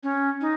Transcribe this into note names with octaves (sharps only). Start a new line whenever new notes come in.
C#4
D#4